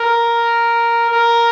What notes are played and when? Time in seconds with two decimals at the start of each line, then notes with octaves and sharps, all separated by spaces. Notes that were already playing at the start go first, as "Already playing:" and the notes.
Already playing: A#4
1.10 A#4